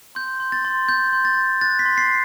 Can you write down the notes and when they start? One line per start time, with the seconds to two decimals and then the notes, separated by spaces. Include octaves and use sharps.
0.15 C6 G6
0.40 C6
0.52 A6
0.65 C6
0.88 C6 G6
1.13 C6
1.25 A6
1.37 C6
1.61 F#6 A6
1.79 B6
1.85 C6
1.98 C7